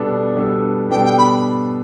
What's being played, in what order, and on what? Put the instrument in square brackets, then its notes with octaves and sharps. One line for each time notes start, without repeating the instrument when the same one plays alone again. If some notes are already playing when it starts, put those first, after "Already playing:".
Already playing: [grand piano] B2 G3 B3 D4 A4
B2 G3 B3 D4 A4
[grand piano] B2 G3 B3 D4 A4 [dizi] G5
[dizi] G5
B5